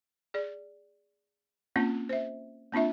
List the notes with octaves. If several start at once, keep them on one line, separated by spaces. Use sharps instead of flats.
G#4 D5
A#3 C4 C#4 F4
C5 E5
A#3 C4 D4 F4 E5